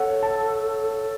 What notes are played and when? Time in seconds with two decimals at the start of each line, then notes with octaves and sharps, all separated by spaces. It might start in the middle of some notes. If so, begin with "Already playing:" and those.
Already playing: A4 C#5 F#5
0.23 A5